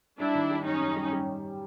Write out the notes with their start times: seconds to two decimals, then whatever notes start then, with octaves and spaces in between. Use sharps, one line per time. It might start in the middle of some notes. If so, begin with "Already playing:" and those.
0.19 G3 D4 E4
0.35 D#3
0.51 G3
0.65 F#2 C#4 D#4
0.81 F#2
0.96 G3
1.13 G3